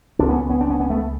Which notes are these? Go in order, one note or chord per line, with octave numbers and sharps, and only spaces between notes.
C#2 C#3 C4 D4
B3 C#4
B3 C#4
C4 D4
B3 C#4
B3 C#4
A3 B3